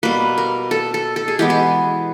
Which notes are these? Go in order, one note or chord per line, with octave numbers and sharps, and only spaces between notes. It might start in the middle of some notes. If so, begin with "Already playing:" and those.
B2 G3 A#3 B4
A#4
A4
A4
A4
G#4
E3 G#3 B3 G4
G#4